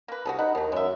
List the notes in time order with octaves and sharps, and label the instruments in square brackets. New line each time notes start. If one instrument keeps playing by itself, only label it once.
[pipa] A#3 B4
[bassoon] C2 [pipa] F#4 G#4 A4
[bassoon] D#4 [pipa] F#5 B5
[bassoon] D#2 [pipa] B2 F#3
[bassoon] F#2 [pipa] G#3 E5